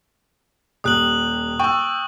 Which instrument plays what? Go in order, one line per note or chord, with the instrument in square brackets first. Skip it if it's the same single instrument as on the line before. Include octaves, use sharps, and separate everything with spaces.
[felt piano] D#1 G4 [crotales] D#6 F#6 F#7
[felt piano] G5 E6 [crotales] C#6